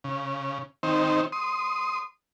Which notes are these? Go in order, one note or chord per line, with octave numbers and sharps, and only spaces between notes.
C#3
D#3 C4 D#4 C5
C6 D#6